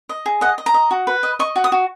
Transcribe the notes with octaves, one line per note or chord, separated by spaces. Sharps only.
D#5
G#4
D#5 F#5
D#5
A#5
D#5
F#4
B4
D#5
D#5 C#6
F#4
D#6
F#4